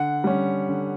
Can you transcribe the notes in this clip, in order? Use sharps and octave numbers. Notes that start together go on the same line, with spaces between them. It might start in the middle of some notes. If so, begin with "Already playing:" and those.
Already playing: D3 F#5
G3 C#4
D3